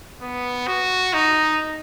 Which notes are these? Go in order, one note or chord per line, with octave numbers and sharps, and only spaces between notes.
B3
F#4
D#4